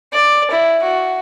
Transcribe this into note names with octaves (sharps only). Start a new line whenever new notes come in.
D5
E4
F#4